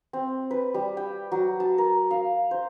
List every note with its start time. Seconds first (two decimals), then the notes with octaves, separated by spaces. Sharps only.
0.13 C4
0.51 B4
0.74 G3
0.97 G5
1.32 F#3
1.60 A5
1.78 A#4
2.11 F5
2.51 C5